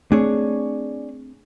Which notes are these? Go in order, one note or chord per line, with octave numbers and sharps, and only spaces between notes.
A3 C4 D4 G#4 C#5